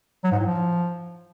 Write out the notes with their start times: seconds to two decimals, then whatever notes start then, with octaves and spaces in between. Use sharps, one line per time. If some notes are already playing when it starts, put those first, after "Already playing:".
0.24 F#3
0.32 G#2
0.39 A2
0.47 F3